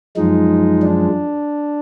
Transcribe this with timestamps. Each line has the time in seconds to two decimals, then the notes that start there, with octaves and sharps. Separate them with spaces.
0.16 F#2 F3 G#3 D#4
0.82 D4